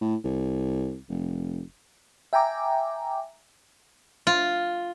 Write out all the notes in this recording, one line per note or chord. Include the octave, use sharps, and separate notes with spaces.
A2
C2
F1
E5 G5 G#5 A#5 D6
F4